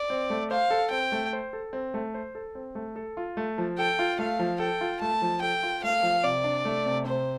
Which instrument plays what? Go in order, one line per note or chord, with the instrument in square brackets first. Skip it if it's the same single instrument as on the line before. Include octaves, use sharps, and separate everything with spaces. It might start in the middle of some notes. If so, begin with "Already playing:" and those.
Already playing: [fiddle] D5
[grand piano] C4
A3
[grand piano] C5 [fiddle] F5
[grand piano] A4
[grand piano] C4 [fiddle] G5
[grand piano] A3
C5
A4
C4
A3
C5
A4
C4
A3
A4
F4
A3
F3
[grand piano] A4 [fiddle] G5
[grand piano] F4
[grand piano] A3 [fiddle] F5
[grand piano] F3
[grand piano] A4 [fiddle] G5
[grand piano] F4
[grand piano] A3 [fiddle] A5
[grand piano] F3
[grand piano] A4 [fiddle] G5
[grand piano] F4
[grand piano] A3 [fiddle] F5
[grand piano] F3
[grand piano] C3 [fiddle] D5
[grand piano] D4
A3
C3
[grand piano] C3 [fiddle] C5